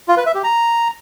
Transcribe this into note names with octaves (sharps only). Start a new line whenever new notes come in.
F4
B4
E5
G4
A#5